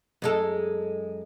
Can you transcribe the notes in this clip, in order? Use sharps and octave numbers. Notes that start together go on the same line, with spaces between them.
F#2 G#3 A4